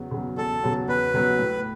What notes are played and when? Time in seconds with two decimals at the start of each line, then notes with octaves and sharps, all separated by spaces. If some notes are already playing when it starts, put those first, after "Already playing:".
Already playing: E2 C#3 F#3 B3
0.11 C#3 F#3 B3
0.37 E2 A4
0.62 C#3 F#3 B3
0.88 E2 B4
1.14 C#3 F#3 B3
1.39 A2